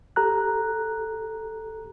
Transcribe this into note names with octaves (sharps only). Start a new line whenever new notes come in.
G4 A4 A#5 F#6